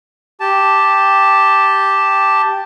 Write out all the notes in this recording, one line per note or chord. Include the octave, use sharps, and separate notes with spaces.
G4 A5